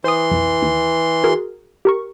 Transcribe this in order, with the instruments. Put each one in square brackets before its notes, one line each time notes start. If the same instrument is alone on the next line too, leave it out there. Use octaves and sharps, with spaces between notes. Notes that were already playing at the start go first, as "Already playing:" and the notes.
[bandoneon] E3 C6 [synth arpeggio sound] C5 D#6
[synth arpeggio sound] B1 F2
D#2
F#4 G#4 A#4
G4 A#4 C#6